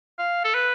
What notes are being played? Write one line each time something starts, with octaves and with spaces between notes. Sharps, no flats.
F5
A4
B4